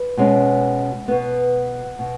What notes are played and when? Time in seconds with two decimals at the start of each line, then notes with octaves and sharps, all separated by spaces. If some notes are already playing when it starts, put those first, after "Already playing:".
Already playing: B4
0.17 B2 G#3 C#4
1.08 B2 B3
1.99 B2